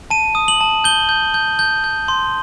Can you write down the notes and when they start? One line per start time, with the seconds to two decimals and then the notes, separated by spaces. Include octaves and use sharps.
0.10 A5 D#7
0.35 D#6
0.48 F#7
0.61 A5
0.84 G6 G7
1.09 G6
1.34 G6
1.59 G6
1.84 G6
2.08 C6